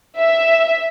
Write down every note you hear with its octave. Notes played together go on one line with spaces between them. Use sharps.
E5